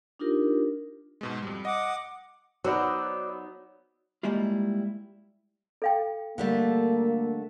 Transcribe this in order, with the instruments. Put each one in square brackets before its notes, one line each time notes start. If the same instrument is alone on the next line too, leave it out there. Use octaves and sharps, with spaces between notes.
[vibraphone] D4 D#4 F4 G4 A#4
[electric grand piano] G#2 B2 G#3
F2 G3
[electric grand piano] D#5 [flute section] F#5 D6 D#6
[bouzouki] F#3 [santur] B3 D#4 E6 [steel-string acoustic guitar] F#4 C5 D5
[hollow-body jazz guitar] G3 G#3 A#3 E4 F4
[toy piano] A4 F5 G5
[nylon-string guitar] D3 G3 A3 [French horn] A#3